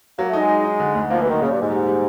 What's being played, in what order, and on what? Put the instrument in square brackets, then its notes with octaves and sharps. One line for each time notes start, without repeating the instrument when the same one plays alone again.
[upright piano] F#3 [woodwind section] A#3
[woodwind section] A3
[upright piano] D#4
[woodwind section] G#3
[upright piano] D#4
D#4
D3
D2
[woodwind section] F3 [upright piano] A#3
[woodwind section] E3
[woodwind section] D#3 [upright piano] F#3
[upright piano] A#2 [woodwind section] C#3
[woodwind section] G2
[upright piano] G3
[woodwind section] G#2
[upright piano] G3
G3